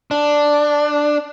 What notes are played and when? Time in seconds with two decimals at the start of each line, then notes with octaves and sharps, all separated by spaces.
0.11 D4